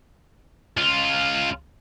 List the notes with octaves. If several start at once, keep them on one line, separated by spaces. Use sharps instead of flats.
C#2 F4